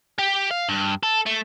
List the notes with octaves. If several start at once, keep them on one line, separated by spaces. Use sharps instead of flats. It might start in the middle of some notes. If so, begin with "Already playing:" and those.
G4
F5
G2
A4
A3